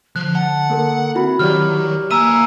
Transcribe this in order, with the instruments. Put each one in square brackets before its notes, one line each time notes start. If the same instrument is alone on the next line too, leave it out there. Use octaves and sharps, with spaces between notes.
[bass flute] D3 [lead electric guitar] F3 [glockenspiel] F#6
[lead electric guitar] F#5 [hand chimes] A5
[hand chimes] A#3 A4 A#4
[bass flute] C4 [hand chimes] E4 F#4 B5
[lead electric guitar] D#3 [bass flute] F#3 [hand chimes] G4 C#5 D5 [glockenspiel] F6
[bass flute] A#3 [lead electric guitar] E5 G#5 [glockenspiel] A#5 E6 D#7